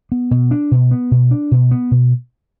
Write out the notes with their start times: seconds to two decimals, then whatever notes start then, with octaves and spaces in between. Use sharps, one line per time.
0.12 B3
0.31 B2
0.51 D4
0.71 B2
0.91 B3
1.11 B2
1.31 D4
1.51 B2
1.71 B3
1.91 B2